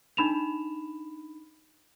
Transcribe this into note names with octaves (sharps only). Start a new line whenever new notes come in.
D4 D#4 B5 E7 F7